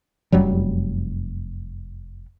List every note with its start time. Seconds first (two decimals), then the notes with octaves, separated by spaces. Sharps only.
0.32 F1 F#2 F#3 G3